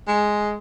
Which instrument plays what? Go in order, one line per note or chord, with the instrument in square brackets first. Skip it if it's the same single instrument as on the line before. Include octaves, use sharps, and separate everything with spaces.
[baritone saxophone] G#3